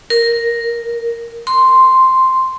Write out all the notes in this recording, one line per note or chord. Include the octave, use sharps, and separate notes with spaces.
A#4
C6